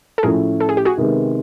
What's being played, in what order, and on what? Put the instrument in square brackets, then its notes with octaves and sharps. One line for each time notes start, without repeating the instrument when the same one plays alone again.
[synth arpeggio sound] A4
[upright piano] A2 F3 A3 C#4 E4 [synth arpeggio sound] G#4 A#4
[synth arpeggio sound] A4
G#4
G4
F#4 G#4
[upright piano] C3 D#3 G#3 B3